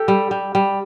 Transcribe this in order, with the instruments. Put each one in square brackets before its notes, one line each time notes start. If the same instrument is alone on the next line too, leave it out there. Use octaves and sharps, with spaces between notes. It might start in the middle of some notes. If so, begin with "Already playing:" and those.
Already playing: [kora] G4 [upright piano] A4
[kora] G3
G3
G3